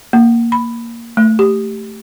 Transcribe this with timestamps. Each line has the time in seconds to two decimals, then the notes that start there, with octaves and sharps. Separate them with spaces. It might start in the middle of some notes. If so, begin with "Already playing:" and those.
0.13 A#3
0.52 B5
1.17 A3
1.39 G4